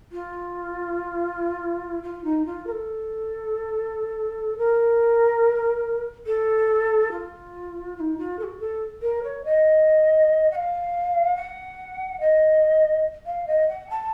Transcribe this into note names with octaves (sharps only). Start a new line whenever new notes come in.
F4
F4
D#4
F4
A#4
A4
A#4
A4
F4
F4
D#4
F4
A4
F#4
A4
A#4
C#5
D#5
F#5
F5
F#5
D#5
F5
D#5
F#5
A5